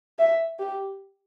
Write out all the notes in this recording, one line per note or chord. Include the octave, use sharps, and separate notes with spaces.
E5
G4